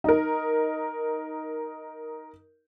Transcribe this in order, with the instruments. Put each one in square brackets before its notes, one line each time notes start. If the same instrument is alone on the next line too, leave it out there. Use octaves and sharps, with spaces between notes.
[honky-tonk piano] D#4 A#4